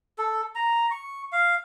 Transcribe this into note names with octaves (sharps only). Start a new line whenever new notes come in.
A4
A#5
C#6
F5